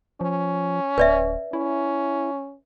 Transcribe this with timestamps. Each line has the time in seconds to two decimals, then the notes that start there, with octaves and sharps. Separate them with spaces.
0.21 F3 C#4
0.98 D1 B4 D5 E5
1.53 C#4 E4